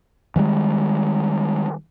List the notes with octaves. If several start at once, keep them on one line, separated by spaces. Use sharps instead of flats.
D#3 F3 G3 G#3